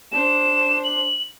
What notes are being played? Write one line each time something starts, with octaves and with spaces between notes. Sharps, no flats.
D4 C5 E7
F#7